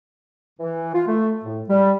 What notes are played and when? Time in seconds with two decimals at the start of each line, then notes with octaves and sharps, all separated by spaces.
0.58 E3
0.94 F4
1.06 A3
1.43 A2
1.68 G3